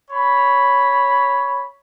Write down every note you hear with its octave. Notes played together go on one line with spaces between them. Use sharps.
C#5 B5